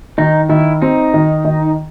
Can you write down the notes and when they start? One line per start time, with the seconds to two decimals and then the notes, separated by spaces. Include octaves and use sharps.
0.18 D#3 D#4
0.49 D#3 E4
0.82 C4 D#4
1.14 D#3
1.45 D#3